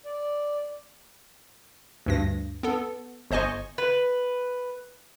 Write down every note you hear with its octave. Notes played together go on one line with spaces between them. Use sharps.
D5
D2 G2 A#6
B3 A4
G1 C5 D#5 G#5 C#6
B4